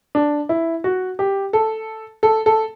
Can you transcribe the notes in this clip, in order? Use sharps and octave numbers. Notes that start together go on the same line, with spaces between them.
D4
E4
F#4
G4
A4
A4
A4